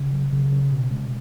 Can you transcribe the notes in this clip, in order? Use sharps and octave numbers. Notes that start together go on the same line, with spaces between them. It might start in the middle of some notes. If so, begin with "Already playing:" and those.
Already playing: C#3
F#3
C#3
C#4
B2
G#3